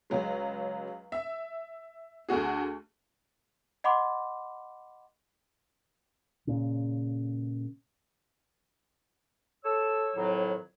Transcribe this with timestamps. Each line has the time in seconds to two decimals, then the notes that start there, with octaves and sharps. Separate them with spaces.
0.10 C#2 F#3 G#3
1.12 E5
2.29 D2 A3 F#4 G#4
3.84 D#5 F#5 B5 C6 D6
6.47 A#2 C#3
9.65 A4 C#5 E6
10.16 F2 A2 D#3 F#3